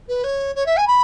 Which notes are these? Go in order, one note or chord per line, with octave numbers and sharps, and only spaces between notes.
B4
C#5
C#5
E5
G#5
B5